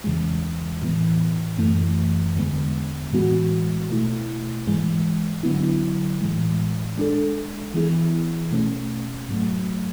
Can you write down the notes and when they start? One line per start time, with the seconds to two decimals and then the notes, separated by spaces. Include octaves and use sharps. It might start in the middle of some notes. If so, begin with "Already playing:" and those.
0.04 E2 C#3 E3 G#3
0.82 A2 E3 B3
1.58 F#2 E3 A3
2.36 E2 D3 G#3 B3
3.12 A2 E3 G#3 B3 F#4
3.89 B2 A3 E4
4.67 G#2 E3 G#3
5.43 D3 F#3 B3 E4
6.21 A2 E3 G#3
6.97 G#3 D4 A4
7.74 E3 B3 E4 G#4
8.51 B2 A3 C#4
9.29 G#2 F#3 A3